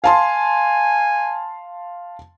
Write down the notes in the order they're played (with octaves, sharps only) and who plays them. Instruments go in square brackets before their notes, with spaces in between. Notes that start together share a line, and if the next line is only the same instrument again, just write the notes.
[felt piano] F5 A5 C6 [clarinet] G#5